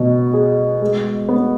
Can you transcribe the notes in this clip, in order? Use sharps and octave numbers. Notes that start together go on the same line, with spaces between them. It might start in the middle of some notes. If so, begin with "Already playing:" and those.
Already playing: B2
G#4
G#3
B3